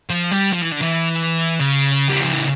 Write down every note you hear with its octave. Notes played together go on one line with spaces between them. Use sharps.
F3
G3
F3
E3
D3
E3
C#3
G3
F3
E3